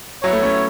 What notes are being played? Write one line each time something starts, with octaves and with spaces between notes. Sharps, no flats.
F#3 B3 E4 C#5
A3
A3 C#4